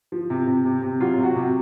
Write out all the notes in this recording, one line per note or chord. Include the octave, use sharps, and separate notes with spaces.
F3
C3
C3
C3
C3
F#3 F4
C3
F#4
C3